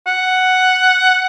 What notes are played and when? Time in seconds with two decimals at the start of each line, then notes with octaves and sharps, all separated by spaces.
0.07 F#5